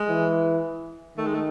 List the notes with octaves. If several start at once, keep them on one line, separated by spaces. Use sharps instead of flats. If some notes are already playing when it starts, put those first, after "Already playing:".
Already playing: G#3
E3
D#3 A3
G#3
A3